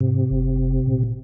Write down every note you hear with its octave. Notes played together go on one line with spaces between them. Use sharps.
G#2 C3
F#1
A#2